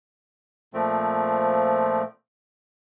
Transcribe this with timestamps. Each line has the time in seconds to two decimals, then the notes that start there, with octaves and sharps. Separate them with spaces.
0.74 A#2 F3 A3 C4